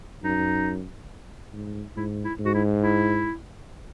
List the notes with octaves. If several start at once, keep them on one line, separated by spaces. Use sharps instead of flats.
F#2 D#4
G#2
G#2 E4
E4
G#2
F#4
E4
E4